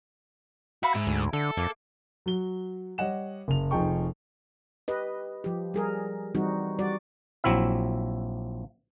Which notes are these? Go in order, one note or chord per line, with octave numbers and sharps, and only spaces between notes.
F#4 E5 F5 B5
G#2 E4
D2
D3 A4
F2 A#3
F#3 F#4 G7
G3 C#5 D#5 F#5 E7
F#1 F7
F1 F3 D#4 G#4 G5 C#6
G4 B4 D#5
F3 G4
G3 G#4 A#4
E3 G3 C4 D#4 F#4
G3 F#4 D5
A#1 F#3 C4 E4 E5